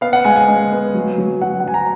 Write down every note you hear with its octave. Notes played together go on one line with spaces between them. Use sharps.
B3 F5
F#5
G#3 G#5
G#5
G#3
B3
F#3
F#3
F#3 F#5
F#5
F#3 G#5
A#5